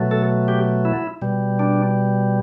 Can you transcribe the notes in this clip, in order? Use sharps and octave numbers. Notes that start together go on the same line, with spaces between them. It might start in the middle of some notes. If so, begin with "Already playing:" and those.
Already playing: B2 F#3 A3
A4
G4
E4
B2 G3
D4